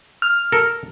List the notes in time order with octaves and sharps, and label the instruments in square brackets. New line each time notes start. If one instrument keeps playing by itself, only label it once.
[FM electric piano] F6
[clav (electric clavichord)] A4 A#4